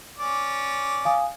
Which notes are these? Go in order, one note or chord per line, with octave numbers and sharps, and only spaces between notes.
C#4 D5
F5 G#5 D#6